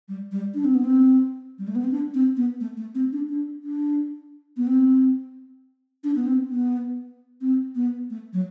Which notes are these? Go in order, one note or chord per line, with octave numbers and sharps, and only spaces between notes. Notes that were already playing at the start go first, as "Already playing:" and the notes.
G3
G3
D4
C4
B3
C4
G3
A3
B3
C4
D4
C4
B3
A3
A3
C4
D4
D4
D4
B3
C4
D4
B3
C4
B3
C4
B3
A3
F#3